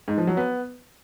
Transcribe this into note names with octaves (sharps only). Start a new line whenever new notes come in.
G#2
F3
F#3
B3